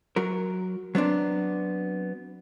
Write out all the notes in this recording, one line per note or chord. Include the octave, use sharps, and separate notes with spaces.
F#3 A#4
F#3 B3 C4 D4